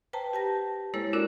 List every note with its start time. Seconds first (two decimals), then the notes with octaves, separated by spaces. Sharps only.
0.13 B4 C5 G5 A5 A#5
0.33 G4 A5 A#6
0.94 G#3 A#3 E4 A4 C5 C#5
1.13 C#4 D4 E4 F#4 A#4 D5